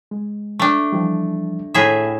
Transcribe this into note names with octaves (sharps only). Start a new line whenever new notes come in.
G#3
A3 D4
E3 F3 G3
D#2 A2 G#4 A4 E5